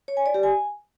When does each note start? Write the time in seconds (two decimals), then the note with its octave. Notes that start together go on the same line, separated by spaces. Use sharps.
0.08 C#5
0.17 G#5
0.26 D5
0.34 G4
0.43 G#5